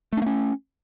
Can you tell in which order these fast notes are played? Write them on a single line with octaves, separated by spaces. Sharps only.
A3 D4 A#3 C#4